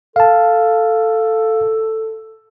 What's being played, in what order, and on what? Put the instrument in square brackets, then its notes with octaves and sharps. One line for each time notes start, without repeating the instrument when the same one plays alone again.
[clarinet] A4 [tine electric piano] F5 A5